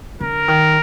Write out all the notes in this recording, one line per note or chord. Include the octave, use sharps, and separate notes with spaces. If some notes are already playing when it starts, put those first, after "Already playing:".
D3 A#4
D#3